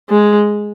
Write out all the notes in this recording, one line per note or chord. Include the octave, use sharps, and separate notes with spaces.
G#3